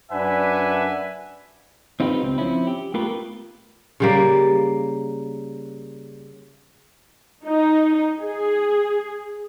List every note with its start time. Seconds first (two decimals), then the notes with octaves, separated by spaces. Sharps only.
0.11 F#2 D4 B4 E5 F#5 G#5
2.00 C4 D#4 F4 G4 B4
2.22 C#2 C4
2.38 F3 C4 C#4 E4
2.67 G4
2.94 A3 B3 F4 G4 A#4 B4
4.00 C#3 G3 A#3
7.45 D#4
8.20 G#4